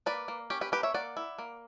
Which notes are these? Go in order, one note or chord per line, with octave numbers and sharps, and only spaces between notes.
A#3 B4 D5
A#3
C#4 G4
G4 B4
A#3 G4 B4
C#5 E5
A#3 D5 F#5
E4
A#3